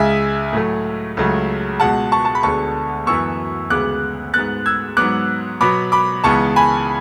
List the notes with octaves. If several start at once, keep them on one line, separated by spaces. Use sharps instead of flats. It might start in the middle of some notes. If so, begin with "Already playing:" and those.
Already playing: C#2 C#3 G#3 E5 G#5
A2 F#3 A3
C#2 C#3 F#3 A3
C#2 B2 G#3 F#5 A5
A5 C#6
A5
B5
D2 D3 G#3 B3 A5 C#6
F#2 E3 B3 C#6 E6
D2 C#3 G#3 B3 D6 F#6
G#2 G#3 B3 F#6 A6
E6 G#6
G#2 F#3 B3 D6 F#6
B2 F#3 B3 B5 D6
B5 D6
C#2 C#3 E3 B3 A5 C#6
G#5 B5